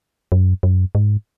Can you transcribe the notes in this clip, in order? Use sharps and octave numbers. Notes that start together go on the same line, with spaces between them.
F#2
F#2
G#2